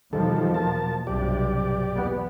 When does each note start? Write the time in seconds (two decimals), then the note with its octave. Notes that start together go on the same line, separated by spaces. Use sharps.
0.13 E2 B2 D#3 F3 G3 A4
0.54 A#3 A5
1.07 B1 G2 C3 G4 D5
1.95 E2 B3